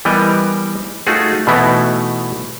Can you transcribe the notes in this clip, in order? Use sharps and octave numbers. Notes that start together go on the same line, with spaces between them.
E3 G3 B3 A#4 D#5
A3 D#4 F4 F#4 G#4
B2 E3 A3 B3 D#4 E4